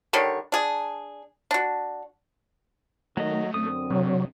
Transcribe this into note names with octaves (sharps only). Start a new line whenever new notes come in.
D3 D#3 G3 C#5
D4 G#4
D4 F#4
D#3 F#3 A3 D#5
F#2 D3 C4 D#6
C3 F#3